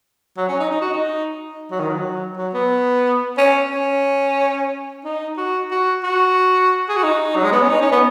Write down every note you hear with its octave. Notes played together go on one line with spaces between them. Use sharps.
F#3
C#4
D#4
D#4
F#4
D#4
F#3
D#3
F#3
F#3
B3
C#4
C#4
D#4
F#4
F#4
F#4
G#4
F#4
D#4
F#3
G#3
B3
C#4
D#4
C#4
B3